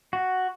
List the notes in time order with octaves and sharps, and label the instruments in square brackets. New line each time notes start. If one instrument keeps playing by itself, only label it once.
[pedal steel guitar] F#4